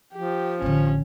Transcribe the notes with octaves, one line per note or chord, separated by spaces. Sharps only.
F3 G4
A1 D3 C#4